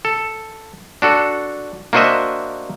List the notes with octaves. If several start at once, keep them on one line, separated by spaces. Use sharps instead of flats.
A4
D4 F#4 A4
A#3 D4 F#4 C5 D#5 E5